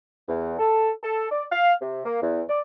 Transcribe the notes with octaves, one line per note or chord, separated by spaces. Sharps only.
E2
A4
A4
D5
F5
C3
A#3
E2
D5